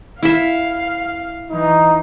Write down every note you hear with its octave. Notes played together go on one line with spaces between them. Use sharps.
E4 E5 F5
E3 D#4